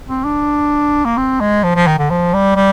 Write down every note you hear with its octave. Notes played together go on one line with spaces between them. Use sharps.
C4
D4
A#3
C4
G#3
F3
F3
D#3
D3
F3
G3
G3